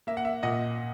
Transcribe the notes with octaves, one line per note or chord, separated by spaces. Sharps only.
A#3 E5
F#5
E5
A#2 D#5 F#5